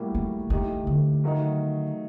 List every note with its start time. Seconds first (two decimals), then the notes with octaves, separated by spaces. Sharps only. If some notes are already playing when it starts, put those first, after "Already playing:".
Already playing: A2 G3 A#3 F#4
0.15 D#3
0.50 A2 D#3 A3 D#4 G4
0.87 D3
1.24 D#3 F#3 A3 D#4